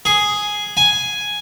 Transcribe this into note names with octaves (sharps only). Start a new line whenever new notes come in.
G#4
G#5